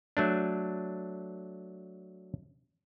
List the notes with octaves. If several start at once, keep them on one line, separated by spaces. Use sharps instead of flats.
F#3 A3 D4